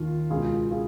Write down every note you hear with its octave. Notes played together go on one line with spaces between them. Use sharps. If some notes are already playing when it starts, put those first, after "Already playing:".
Already playing: D#2 D#3 F4
C#2 B2 F4 G#4
F4 G#4